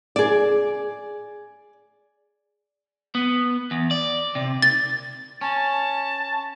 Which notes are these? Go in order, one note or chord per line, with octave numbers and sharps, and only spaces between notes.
G#4 D5
B3
E2
D5
C3
A6
C#4 A5